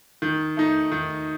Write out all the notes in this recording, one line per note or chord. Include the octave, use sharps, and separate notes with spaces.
D#3
A3 D#4
D#3